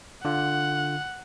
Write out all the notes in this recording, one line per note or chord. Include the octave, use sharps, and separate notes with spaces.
D3 F4 F#5